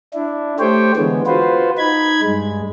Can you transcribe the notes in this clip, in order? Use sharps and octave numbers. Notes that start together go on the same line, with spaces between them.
D4 E4
A3 G4 C5 C#5 G5
D3 E3 G#3 B3
F4 F#4 B4 C5
D#4 B5 G#6
G2 G#3